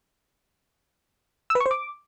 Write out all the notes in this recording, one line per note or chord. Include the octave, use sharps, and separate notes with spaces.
E6
B4
C#6
C5
D6